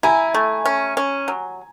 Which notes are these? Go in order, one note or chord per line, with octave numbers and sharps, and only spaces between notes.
E4 G#5 A#5
A3
C#4
C#4
F#3